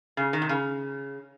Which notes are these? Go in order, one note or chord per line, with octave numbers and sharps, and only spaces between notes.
C#3
D#3
C3
C#3